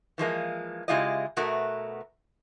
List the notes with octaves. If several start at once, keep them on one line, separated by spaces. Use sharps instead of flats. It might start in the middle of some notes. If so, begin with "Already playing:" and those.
E3 F3 G#3 A#3
C#3 G#3 E4 F4 G4 D#5
B2 A3 B3 F#4 A#4